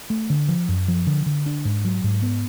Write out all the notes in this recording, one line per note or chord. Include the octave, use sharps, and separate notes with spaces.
A3
D3
F3
F#2
F3
D3
D3
D4
G#2
F#3
G#2
B3